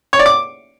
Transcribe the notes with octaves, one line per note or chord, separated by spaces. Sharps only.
C#5
D5
D6